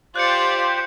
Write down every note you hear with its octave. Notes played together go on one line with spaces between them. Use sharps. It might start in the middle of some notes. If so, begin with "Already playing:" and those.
F4 G4 C5 D5 F#6 G6 C#7